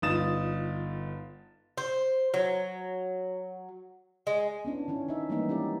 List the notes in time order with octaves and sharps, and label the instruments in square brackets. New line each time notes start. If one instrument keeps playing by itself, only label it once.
[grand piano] G1 D#4 F4 D#6 A6 E7
[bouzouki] C5
F#3
G#3
[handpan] B3 C#4 D4 E4
D#3 C#4 E4
D#4 E5
E3 G3 G#3 A#3 B3 D#4
C#4 E4 G4 D5